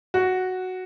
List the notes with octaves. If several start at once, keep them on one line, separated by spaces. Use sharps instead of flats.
F#4